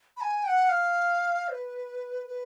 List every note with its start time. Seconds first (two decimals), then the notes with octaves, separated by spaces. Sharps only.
0.17 B5
0.21 G#5
0.44 G5
0.48 F#5
0.69 F5
1.48 C5
1.52 B4
2.27 B4